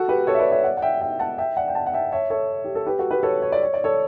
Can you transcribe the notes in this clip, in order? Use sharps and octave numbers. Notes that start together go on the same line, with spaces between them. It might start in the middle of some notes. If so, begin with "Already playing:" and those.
Already playing: F#4 A4
G4 B4
A4 C#5
E5
B4 D5
C#5 E5
D5 F#5
F#5
E5 G5
E5 G5
F#5 A5
E5 G5
D5 F#5
G5
F#5 A5
F#5
E5 G5
C#5 E5
A4 C#5
G4
A4
G4 B4
F#4 A4
G4 B4
A4 C#5
C#5
D5
C#5
D5
A4 C#5